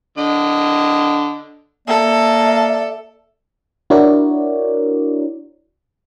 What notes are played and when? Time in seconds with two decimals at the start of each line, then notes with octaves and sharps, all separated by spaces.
0.18 D3 D#5
1.88 A#3 A4 D5 E5
3.90 D4 E4 F#4 A#4 C#5 D5